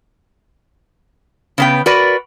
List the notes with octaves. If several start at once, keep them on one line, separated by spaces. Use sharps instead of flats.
C#3 B3 G5
F#4 A#4 B4 D5